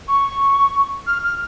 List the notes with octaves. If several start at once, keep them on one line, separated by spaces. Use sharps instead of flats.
C#6
F6
F6